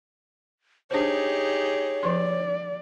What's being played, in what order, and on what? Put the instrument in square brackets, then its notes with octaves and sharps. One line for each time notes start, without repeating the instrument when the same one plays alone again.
[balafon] D4 C5 [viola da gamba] D#4 G4 G#4 [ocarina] C#5
[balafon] F3 C6 [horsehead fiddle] D5